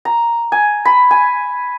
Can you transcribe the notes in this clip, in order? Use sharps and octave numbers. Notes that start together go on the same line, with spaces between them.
A#5
G#5
B5
G#5